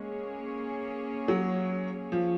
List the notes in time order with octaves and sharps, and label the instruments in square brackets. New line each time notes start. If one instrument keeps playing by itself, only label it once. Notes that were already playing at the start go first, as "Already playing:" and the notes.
Already playing: [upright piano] G#3 [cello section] A#3 C#4 G#4 C#5
[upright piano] F#3
F3